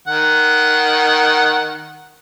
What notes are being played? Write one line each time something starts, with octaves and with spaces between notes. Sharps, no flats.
D#3 F#5